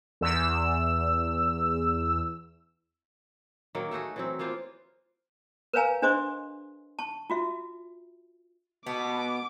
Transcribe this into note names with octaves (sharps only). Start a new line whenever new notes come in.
E2 E6
D#3 F#3 A#3
A3 D#4 F#4 G#4
E3 F#3 C4
A#3 B3 F4 C5
A#4 B4 C#5 F5 G#5 A#5
D4 G#4 C5 D#5 C6 D6
A5 C#6
F4 F#4 E5
B2 B3 A5 D6